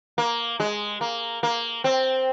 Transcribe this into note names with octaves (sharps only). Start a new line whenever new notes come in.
A#3
G#3
A#3
A#3
C4